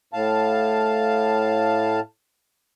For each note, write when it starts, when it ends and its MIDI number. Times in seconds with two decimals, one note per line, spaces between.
0.13 2.00 45
0.13 2.00 77
0.13 2.00 81